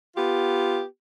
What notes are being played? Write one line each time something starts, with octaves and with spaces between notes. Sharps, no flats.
B3 F4 G4